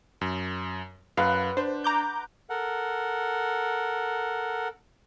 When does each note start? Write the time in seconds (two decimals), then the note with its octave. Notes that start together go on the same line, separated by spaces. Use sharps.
0.21 F#2
1.17 F#2 B4 F5 F#5
1.57 D4 C5
1.84 A#5 D6 G6
2.50 A4 A#4 F#5